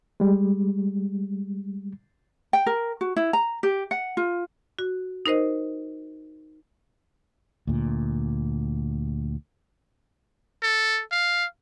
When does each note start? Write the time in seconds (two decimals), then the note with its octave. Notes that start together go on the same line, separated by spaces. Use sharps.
0.20 G3 G#3
2.53 G5
2.66 A#4
3.01 F#4
3.16 E4
3.33 A#5
3.63 G4
3.91 F#5
4.17 F4
4.79 F#4
5.26 D#4 A#4 C5 D#5
7.67 D2 A#2
10.62 A4
11.11 F5